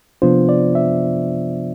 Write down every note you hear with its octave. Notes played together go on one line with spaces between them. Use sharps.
C3 F3 B3 D4 F4 C5
D5
E5